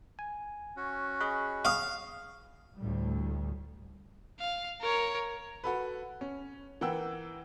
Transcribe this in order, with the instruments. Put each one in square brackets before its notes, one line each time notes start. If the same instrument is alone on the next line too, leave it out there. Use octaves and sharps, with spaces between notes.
[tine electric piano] G#5
[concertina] C#4 F#4
[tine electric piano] G#4 D#5 B5 [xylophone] F#6
[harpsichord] F5 [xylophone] C#6 D#6
[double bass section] D2 A2 G3
[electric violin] F5
A#4 C#5
[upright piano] F#4 A4 B4
C#4
E3 A#3 F#5 G5 E6